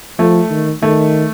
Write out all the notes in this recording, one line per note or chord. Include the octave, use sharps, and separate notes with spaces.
F3 A3
D#3
D#3 A3